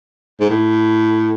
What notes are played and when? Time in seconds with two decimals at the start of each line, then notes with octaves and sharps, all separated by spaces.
0.40 G#2
0.49 A2